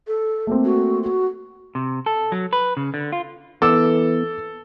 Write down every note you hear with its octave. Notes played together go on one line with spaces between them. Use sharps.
A4
A3 A#3 C4
F#4
F#4
C3
A4
F#3
B4
C#3
D3
F4
E3 B3 A4 D6 E6